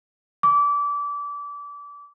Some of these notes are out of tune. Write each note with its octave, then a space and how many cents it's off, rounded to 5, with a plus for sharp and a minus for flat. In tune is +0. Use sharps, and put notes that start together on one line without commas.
D6 -25